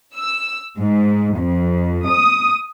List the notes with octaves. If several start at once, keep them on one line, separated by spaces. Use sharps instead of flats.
E6
G#2
F2
D#6